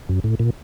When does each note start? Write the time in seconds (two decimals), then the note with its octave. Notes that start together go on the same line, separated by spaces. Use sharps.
0.09 F#2
0.24 A2
0.39 A#2